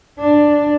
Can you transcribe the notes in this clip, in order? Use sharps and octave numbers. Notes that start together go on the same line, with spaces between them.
D4